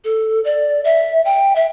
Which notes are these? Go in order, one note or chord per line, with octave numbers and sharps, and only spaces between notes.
A4
D5
E5
G5
E5